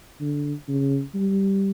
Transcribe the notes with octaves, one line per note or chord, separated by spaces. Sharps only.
D3
C#3
G3